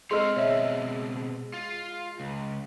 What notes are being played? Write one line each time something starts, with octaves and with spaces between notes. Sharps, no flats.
G#3 C4 C#5 D#5 C6 E6 F6
B2 C4 C#5 D#5 E5
F4
C#2